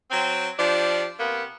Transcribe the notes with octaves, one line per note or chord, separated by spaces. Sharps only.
F#3 C4
F3 D4 G4
C3 A#3 B3